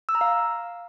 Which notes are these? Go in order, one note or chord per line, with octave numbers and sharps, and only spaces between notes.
E6
A#5
F5